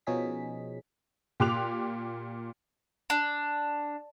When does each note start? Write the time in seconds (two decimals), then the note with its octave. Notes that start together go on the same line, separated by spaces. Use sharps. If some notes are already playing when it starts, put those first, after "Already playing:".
0.07 B2 F3 C#4 D#4 G#4 B6
1.40 A#2 G4 C6 D6 F#6 F7
3.10 D4